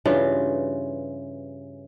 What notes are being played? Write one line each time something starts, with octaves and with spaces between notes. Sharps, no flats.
G2 C#3 E3 F4